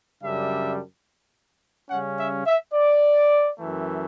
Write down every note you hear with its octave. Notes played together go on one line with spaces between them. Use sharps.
F#2 C#3 G3 D4 E5
C#3 G3 C#4 F#5
E5
E5
D5
F#2 E3 A3